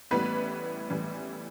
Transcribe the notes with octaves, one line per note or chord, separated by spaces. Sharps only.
A1 A2 E3 G3 B3 B4
A1 A2 E3 G3